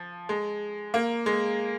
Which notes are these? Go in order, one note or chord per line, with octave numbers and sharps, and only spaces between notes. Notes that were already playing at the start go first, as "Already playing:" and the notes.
Already playing: F3
G#3
A#3
G#3